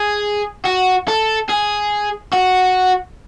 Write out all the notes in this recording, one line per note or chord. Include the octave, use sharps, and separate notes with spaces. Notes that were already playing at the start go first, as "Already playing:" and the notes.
Already playing: G#4
F#4
A4
G#4
F#4